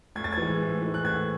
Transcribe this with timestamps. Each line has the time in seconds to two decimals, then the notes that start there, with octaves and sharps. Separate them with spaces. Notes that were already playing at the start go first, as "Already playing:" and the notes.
0.15 A2 G#6
0.24 A6
0.33 G#6
0.38 E3 G#3
0.60 A2
0.82 E3 G#3
0.94 F#6
1.05 A2 G#6